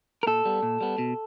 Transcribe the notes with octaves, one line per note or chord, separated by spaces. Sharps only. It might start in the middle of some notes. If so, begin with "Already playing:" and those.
A#4
A#2 A4
G3 B3
A#2
G3 B3
B2